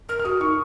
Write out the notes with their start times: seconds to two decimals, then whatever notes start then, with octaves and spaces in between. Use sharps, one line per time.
0.09 A#4 F6
0.20 F6
0.25 F#4 D#6
0.40 D#4 C#6